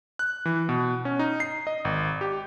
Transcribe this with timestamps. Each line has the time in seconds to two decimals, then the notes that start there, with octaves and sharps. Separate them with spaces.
0.19 F#6
0.45 E3
0.69 B2
1.05 C#4
1.19 D#4
1.40 C7
1.67 D#5
1.85 G#1
2.21 G4